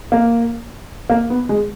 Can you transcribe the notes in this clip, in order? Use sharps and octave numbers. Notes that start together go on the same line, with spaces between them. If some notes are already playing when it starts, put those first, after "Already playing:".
A#3
A#3
B3
G#3